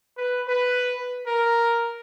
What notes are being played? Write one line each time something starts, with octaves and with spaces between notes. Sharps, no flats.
B4
B4
A#4